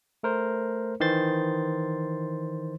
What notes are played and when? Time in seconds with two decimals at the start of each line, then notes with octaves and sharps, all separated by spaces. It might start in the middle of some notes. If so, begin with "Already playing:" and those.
0.23 A3 A#4 C5
1.00 D#3 E3 C5 C6 A6